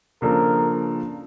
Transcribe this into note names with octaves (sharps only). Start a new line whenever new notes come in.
C#3 F3 A#3 D4 A4 A#4